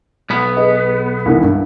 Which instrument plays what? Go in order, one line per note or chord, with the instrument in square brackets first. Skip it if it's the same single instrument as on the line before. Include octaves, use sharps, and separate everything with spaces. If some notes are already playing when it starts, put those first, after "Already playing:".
[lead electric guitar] B1 B3
[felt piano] G#4 B4 D#5
C2 D#3 E3
G2